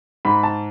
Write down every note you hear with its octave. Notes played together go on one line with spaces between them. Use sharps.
G#2 B5
A5